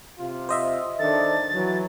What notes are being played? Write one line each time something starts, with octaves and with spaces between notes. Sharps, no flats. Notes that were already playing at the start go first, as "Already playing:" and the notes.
C3 F4
C5 D#5 E5
D#3 D4 A4 A6
E3 F#3